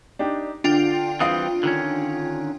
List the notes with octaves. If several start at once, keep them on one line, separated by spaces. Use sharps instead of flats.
D4 D#4 G4
D3 D4 F4 G5
E3 G3 C4 F5 D#6
D3 D#3 C#4